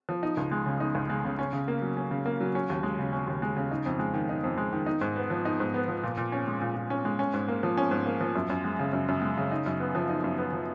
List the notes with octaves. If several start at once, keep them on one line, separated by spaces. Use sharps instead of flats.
F3
D#4
C#2
G#3
C#3
D#4
C#2
G#3
C#3
C#4
C#3
A#3
F#3
C#4
C#3
A#3
F#3
C#4
D#2
G#3
C#3
C#4
D#2
G#3
C#3
D#4
F2
G#3
D#3
D#4
F2
G#3
D#3
D#4
G#2
B3
F3
D#4
G#2
B3
F3
A#2
A#2
C#4
G#3
A#2
A#2
C#4
G#3
C#4
G#2
A#3
F3
C#4
G#2
A#3
F3
F#2
F#2
G#3
C#3
F#2
F#2
G#3
C#3
D#4
F#2
B3
F3
D#4
F#2
B3
F3